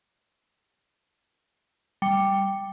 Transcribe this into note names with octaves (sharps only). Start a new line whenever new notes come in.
G3 G5 C#7